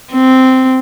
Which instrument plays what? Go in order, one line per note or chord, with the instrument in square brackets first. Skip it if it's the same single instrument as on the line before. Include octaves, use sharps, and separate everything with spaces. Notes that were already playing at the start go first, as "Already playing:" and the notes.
[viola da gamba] C4